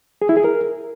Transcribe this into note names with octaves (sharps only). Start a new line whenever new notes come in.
G#4
E4
G#4
A#4